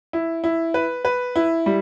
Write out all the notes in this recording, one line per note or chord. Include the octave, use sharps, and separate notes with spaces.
E4
E4
B4
B4
E4
G3